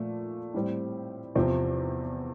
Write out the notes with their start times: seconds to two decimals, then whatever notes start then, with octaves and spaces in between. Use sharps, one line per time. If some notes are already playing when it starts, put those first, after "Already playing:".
Already playing: A#2 F3 A3
0.54 A2 G3 C4
1.35 E2 C3 F3 C4